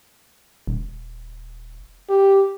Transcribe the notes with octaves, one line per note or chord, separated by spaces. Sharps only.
D#1
G4